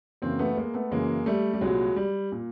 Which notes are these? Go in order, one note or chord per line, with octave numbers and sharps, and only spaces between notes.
F#2 C#3 E3 A#3 C4
A3 B3
G#3 A#3
A3 B3
F#2 C#3 E3 G#3 A#3
G3 A3
G3
C2 A#2 F#3 G#3
G3
A#2